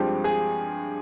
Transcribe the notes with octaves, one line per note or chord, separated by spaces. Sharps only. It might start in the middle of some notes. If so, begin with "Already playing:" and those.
Already playing: G2 F3 G#3 C4 G4
G#4